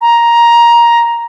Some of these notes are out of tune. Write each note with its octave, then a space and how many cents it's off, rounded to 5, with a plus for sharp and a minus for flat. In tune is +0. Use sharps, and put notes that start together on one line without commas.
A#5 +10